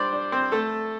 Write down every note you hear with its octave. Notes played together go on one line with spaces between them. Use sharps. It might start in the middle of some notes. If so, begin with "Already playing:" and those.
Already playing: G3 D4 C5 D5
D4
C4 C5
A3 A4